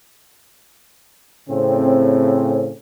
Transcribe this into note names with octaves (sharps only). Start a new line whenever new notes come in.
A2 C#3 C4